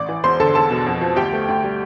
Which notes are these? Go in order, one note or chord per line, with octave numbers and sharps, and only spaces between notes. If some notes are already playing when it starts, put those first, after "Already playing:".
Already playing: A1 D5 D6
E3
E1 C5 C6
D3 A4 A5
E1 A4 A5
B2
F2
F3
D2 G4 G5
A3
D2
G3